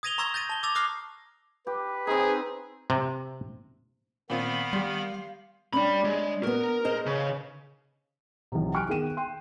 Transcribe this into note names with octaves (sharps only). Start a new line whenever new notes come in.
D#6 G#6 A#6 D#7 F7 G7
A#5 C6 C#6 E6 G#6 A#6
G6 A6 A#6 D#7
A5 G7
D6 E6 A6 F7
D6 D#6 F6 F#6 A#6 C7
G4 B4
C4 D#4 G#4
C3
A#2 D#3 B3 C4 F5 B5
G3 G4 C6
G3 C#4 D4 B5
G#3
B3 F#4 A#4
G#4 C5 D#5
C#3
B1 E2 C3
G5 G#5 C#6 F6 F#6 D7
D#3 B3 G#4 G5 D#7 E7
G5 C6